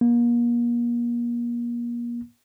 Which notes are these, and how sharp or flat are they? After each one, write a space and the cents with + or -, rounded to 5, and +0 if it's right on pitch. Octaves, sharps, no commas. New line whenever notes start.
A#3 +35